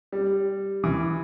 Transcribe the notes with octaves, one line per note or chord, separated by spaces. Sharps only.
G3
E3